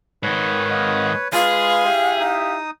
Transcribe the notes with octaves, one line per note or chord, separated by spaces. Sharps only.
G#2 D#3 B4 C#5
D#5 F5 F#5
G#3 F4 G#4 B4 F5 C6
E4 G4
D#4 D#6